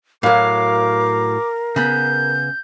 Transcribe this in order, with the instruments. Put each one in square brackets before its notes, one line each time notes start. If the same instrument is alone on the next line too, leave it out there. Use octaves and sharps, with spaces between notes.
[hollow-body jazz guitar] A2 F#3 [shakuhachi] A#4 [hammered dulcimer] F5 [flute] D6
[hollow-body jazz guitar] C#3 B3 [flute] G6